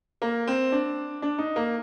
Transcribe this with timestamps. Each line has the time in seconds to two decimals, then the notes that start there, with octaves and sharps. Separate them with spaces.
0.22 A#3
0.47 C4
0.72 D4
1.22 D4
1.38 D#4
1.56 A#3